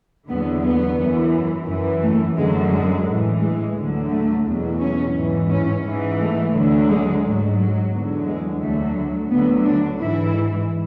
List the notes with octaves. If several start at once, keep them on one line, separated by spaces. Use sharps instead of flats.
E2 D3 F#3 B3
B3
F#2 E3
F#2 E3
A3
F#2 D3 F#3 G#3
G#3
A2 E3
G#3
D2 D3 F#3
A3
E2 B2 F#3
C#4
G#2 E3
C#4
G#2 E3
A3
D2 D3 F#3
G#3
G#2 F#3
F#3
E2 D3 F#3
G#3
D2 D3 F#3 A3
D2 D3 F#3 B3
D4
G#2 E3 E4